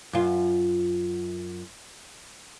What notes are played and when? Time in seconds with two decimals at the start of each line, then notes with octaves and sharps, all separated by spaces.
0.13 F#2 F4